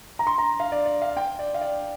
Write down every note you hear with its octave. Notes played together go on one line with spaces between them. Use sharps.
A#5
C6
A#5
F5
D5
D5
F5
G5
D5
F5
D5